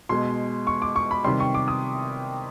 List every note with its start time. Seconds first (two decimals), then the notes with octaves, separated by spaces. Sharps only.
0.09 B2 G#3 C6
0.67 C#6
0.82 D6
0.96 C#6
1.11 B5
1.24 C3 D#3 G3 C6
1.40 C#6
1.54 D6
1.68 D#6